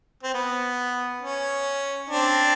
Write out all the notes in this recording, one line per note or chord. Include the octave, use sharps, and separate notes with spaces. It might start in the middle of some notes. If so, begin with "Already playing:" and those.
C4
B3
C#4
C4 D4